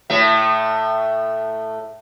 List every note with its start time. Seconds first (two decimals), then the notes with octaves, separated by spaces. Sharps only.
0.10 A2 A3 E5